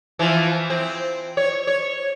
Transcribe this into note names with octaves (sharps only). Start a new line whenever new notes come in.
E3 F3 F4
C4
C#5
C#5